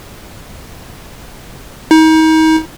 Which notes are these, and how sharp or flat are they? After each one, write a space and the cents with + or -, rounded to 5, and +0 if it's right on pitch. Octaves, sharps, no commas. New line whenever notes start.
D#4 +35